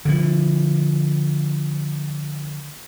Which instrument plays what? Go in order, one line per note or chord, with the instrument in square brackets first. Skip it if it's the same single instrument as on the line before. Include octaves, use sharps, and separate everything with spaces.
[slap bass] D3 F3